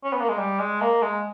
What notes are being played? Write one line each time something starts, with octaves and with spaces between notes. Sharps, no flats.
C#4
B3
A#3
G#3
G3
G#3
A#3
G#3